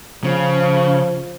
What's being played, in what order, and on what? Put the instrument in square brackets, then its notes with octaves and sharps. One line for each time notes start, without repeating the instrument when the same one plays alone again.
[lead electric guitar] C#3 [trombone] F3